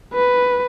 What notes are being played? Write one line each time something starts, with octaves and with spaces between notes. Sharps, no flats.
B4